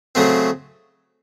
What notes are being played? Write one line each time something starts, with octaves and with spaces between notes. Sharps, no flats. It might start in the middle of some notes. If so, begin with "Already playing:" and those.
C#3 F#3 A3 C4